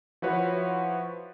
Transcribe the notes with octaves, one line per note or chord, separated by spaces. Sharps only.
F3 E4 F#4 B4 C#5